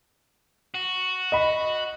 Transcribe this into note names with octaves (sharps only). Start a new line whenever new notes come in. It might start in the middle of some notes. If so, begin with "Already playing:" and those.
F#4
D#5 B5